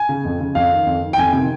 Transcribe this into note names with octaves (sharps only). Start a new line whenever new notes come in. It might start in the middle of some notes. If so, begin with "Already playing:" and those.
Already playing: G#5
C#3
F2
C#3
F2 F5
D#3
F2
D#3
G5
F2 G#5
C3 D#3